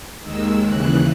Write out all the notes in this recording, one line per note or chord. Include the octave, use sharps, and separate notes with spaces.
D#2 D#3 G#3 E6
D#2 C#3 E3 F#6